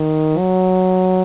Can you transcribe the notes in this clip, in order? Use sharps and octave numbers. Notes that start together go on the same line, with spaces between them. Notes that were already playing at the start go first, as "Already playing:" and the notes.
Already playing: D#3
F#3